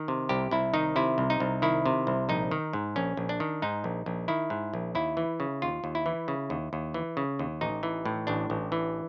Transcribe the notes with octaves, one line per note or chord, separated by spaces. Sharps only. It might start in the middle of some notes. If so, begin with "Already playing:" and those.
Already playing: D#3
C3
C2 G4
C2 E4
D#3 D#4
C3 E4
C2
D#4
C2
D#3 E4
C3
C2
A#1 D#4
D#3
G#2
A#1 C#4
A#1
D4
D#3
G#2 D#4
A#1
A#1
D#3 E4
G#2
A#1
D#2 E4
E3
C#3
D#2 F4
D#2
E4
E3
C#3
D#2
D#2
E3
C#3
D#2
A1 D#4
E3
A2
A1 D4
A1
E3